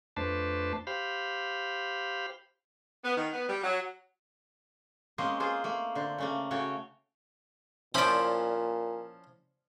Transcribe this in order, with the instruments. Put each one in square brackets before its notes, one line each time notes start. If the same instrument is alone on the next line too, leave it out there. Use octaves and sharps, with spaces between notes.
[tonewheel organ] F2 A3 D4 B4 C5 A5
G4 C5 F5 B5
[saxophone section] B3
D#3
B3
G3
F#3
[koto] G#3 A#3 C4 C#4 C5 D#5
A#3 F4 G#4 C5
A3 A#3
D3 C5
C#3 A3 A#3
C#3 F#4 A4 C#5 G5
[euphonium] A#2 [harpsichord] F3 C#4 E4 [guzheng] C5 D5